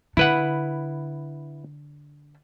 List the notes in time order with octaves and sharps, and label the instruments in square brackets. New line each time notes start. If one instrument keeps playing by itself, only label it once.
[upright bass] D3 [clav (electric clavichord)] E4 B4 F#5